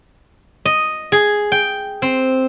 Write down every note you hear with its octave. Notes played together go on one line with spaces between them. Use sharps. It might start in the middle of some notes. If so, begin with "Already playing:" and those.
D#5
G#4
G5
C4